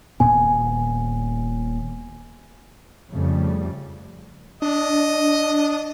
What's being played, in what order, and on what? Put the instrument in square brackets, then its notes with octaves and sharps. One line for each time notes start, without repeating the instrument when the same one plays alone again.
[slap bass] D#1 A#2 B3 [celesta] G#5
[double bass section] F2 C#3 G3 A3
[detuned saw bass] D4 [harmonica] D#5